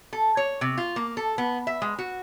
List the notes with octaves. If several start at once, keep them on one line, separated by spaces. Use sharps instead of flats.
A4
C#5
C3
F4
A#3
A4
B3
E5
G#3
F#4